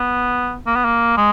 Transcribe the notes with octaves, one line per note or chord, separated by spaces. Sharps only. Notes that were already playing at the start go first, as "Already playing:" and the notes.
Already playing: B3
A#3
B3
A#3
G#3